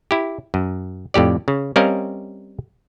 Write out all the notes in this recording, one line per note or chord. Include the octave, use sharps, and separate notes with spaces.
E4 G4
F#2
F2 A2 G4 D5
C#3
G3 C4 C#4 A#4 D#5 F5